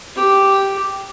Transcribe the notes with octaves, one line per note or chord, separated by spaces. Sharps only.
G4